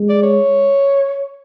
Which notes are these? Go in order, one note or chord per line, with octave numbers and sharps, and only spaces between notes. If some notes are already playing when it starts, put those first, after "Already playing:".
Already playing: G#3
D5
C#5